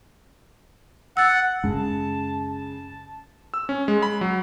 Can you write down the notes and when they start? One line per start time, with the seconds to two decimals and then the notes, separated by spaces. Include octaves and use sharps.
1.17 F#5 E6 A6
1.64 F#2 C#3 G#3 A5
2.45 A5
3.54 E6
3.69 C#4
3.88 G#3
4.03 B5
4.21 F#3